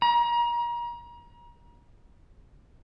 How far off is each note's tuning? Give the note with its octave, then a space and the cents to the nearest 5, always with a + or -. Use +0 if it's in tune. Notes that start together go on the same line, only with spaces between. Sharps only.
A#5 +35